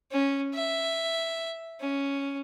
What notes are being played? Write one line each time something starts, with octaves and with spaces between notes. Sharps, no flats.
C#4
E5
C#4